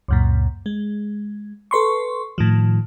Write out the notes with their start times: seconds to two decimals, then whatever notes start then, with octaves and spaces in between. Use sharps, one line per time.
0.08 C#2 F#2 A#2
0.66 G#3
1.71 A4 B4 C6 C#6
2.38 A2 D#3 F3